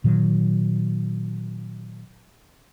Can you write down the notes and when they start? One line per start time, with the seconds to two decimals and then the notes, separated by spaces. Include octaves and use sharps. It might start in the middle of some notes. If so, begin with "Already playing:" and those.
0.04 A#2 D#3 F#3